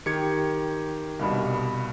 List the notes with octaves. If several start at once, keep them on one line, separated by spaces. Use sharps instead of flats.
D#3 G4 G#6 C#7
C2 G2 B2